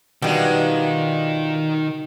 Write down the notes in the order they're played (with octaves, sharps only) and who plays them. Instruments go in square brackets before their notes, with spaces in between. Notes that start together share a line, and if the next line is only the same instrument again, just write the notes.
[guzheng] B2 G3 [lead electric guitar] D#3 D#4 [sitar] F3 G#3 D4